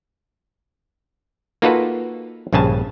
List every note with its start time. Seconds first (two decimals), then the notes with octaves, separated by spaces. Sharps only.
1.62 A#3 D#4 F4 F#4 A4 B4
2.53 A#1 G2 C#3 G#5 A5